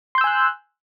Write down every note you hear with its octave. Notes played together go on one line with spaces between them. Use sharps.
G#5 C6 E6 F#6 G6